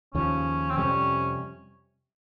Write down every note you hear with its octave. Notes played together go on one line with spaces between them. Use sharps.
D#2 C#3 F3 C#4
C4
F2 C3 G3 C#4